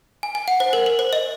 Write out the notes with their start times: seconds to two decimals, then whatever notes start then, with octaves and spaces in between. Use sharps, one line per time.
0.23 G#5
0.35 G#5
0.48 F#5
0.60 C5
0.73 A#4
0.86 A#4
0.99 C5
1.13 D#5